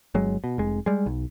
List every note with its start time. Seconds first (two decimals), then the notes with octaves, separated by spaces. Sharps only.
0.14 G1 F#3 G#3
0.44 B2
0.58 F1 G#3
0.86 G3 G#3
1.06 B1